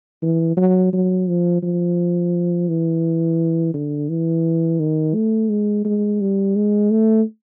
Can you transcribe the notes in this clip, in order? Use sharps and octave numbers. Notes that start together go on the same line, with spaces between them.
E3
F#3
F#3
F3
F3
E3
D3
E3
D#3
A3
G#3
G#3
G3
G#3
A3